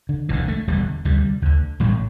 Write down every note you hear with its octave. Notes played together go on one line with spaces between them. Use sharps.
D3
E1 D2 D3 E3
A3
E1 E2 D3 G3
D2 C3 G3
D2 D3
A1 A2 G3